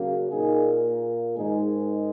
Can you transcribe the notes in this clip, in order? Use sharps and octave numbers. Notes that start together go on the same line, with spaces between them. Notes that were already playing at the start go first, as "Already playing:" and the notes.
Already playing: C#3 F#3 A#3
A#2 A#3 D#4 G#4
G#2 D#3 G#3 D#4 G#4